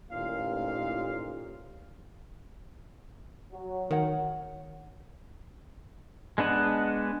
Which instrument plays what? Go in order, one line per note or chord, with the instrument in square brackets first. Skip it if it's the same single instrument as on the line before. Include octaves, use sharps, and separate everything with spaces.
[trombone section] A1 D#2 [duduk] A#2 [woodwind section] F5
[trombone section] F#3
[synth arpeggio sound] D#3 [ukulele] A#4 C#5 F#5
[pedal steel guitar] G#3 B3 D4 D#5 F#5